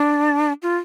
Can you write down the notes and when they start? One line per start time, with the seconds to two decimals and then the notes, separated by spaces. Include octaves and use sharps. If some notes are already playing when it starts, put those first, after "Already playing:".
Already playing: D4
0.63 F4